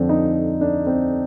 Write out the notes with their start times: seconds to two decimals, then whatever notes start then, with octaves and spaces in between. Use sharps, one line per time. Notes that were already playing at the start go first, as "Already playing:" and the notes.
Already playing: F2 D3 F3 C4 D4
0.09 D#4
0.61 D4
0.87 C4